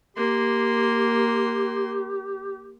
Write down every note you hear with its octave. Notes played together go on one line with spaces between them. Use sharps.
A#3 G4 C6